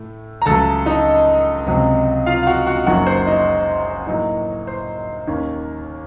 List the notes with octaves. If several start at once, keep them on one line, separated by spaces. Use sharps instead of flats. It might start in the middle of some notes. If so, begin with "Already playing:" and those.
Already playing: A2 A3
A#5
C#2 C#3 F#3 A3 A4 A5
D#4 D#5
C#2 C3 F#3 C4
F4 F5
F5
F#4 F#5
F#4 F#5
F#1 F#2 D#3 F#3 A#3 F#4 F#5
C5 C6
D#4 D#5
A2 F#3 A#3 D#4
C5
D#2 D#3 A#3 C#4